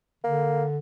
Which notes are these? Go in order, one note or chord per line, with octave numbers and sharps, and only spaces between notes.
D3 A#3